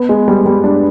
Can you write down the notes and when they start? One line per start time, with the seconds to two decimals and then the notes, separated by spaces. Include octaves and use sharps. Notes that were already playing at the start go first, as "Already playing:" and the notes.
Already playing: B3
0.09 G#3
0.28 G3
0.46 G3
0.64 D4